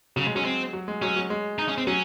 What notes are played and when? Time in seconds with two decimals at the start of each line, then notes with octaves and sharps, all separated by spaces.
0.16 C#3 F#3
0.26 G#3
0.35 F#3 C#4
0.45 C4
0.73 F#3
0.88 G#3
1.02 F#3 C#4
1.16 F#3
1.30 G#3
1.59 D#4
1.68 C#4
1.78 C4
1.87 F#3 C#4